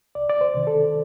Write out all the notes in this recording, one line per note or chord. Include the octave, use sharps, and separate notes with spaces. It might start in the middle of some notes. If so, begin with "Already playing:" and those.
C2 D5
D5
C5
C3 D#3
A4